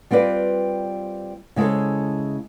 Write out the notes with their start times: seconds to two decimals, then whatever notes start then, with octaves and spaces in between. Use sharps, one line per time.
0.11 G3 C4 F4 B4 D5
1.56 C#3 G#3 E4 A4 C5